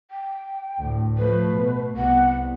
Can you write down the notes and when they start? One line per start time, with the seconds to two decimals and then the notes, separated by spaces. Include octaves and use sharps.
0.11 G5
0.79 D2 A2
1.18 F3 A3 B4
1.55 B2 A3
1.97 C2 B3 F#5